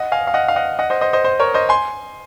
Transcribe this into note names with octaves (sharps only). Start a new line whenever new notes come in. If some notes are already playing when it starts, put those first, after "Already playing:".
Already playing: D#5 F#5
F5 G#5
F5
D#5 F#5
F5
D#5 F#5
D#5 F#5
C5 D#5
C5 D#5
C5 D#5
C5
A#4 C#5
C5 D#5
G#5 C6